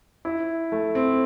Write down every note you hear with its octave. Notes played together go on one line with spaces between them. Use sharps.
E4
A3
C4